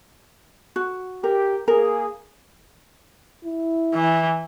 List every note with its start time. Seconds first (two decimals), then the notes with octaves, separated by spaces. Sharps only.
0.76 F#4
1.24 G4 A#4
1.68 A#3 G#4 A#4
3.45 E4
3.95 E3